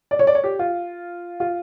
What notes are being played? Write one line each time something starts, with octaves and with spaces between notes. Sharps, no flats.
D5
C#5
D5
C#5
G4
F4
F4